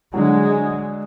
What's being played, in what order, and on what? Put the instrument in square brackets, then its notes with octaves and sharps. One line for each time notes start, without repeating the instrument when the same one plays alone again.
[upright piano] D3 F#3 [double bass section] G#3